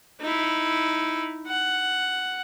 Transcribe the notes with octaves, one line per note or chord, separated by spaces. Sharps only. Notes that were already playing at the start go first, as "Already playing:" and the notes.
D#4 E4
F#5